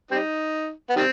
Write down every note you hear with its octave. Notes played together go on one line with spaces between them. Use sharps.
G3 C4 D#4
B3
D#3 G3 C4